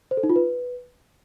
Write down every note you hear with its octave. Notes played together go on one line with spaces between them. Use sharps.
C5
A4
D#4
F4
B4